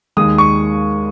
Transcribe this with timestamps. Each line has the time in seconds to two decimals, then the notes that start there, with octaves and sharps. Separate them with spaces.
0.17 D#2 D#3 G#3 D#6
0.38 C#6